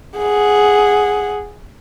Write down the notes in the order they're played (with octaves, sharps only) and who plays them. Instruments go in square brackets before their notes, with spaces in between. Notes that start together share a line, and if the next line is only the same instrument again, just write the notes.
[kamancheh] G#4 F#5